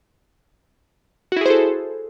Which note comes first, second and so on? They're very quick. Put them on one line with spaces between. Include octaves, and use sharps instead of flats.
F#4 E4 G#4 C5 A4